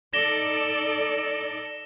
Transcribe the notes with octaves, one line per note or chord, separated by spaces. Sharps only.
D#4 A4 D5 A#6 E7 G7